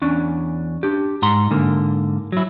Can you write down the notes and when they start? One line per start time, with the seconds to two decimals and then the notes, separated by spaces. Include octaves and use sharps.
0.02 E2 C#4 D4
0.83 D4 G4
1.22 G#2 A#5 C6
1.51 G#2 D3 A#3
2.32 F#3 E4